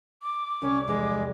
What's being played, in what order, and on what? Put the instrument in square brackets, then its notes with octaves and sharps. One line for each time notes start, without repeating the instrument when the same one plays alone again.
[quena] D6
[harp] C2 [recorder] C#4
[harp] F1 E2 E3 [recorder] G#3